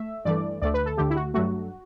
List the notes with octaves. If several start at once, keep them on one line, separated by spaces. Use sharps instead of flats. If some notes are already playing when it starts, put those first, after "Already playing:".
Already playing: A3 E5
G2 E3 A3 D5
D2 D3 A3 D5
B4
A4
D2 D3 A3 G4
E4
F#4
G2 F#3 A3 F#4